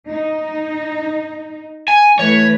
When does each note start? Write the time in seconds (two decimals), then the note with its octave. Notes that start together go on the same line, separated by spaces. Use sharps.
0.10 D#4
1.88 G#5
2.19 E3 A3 B4 C#5